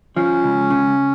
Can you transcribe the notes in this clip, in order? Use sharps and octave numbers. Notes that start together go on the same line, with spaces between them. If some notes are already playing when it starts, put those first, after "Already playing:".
F3 C#4
C#2
C#3